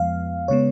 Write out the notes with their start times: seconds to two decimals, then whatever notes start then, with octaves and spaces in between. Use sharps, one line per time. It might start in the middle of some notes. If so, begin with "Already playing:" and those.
Already playing: F2 F3 G#3 B3 F5
0.48 C#3 G#3 B3 C#5